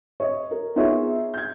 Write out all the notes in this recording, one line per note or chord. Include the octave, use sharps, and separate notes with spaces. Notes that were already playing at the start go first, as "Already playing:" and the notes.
C#5 D#5
A#4
B3 D#4 F4 G#4 C#5 E5
G6 G#6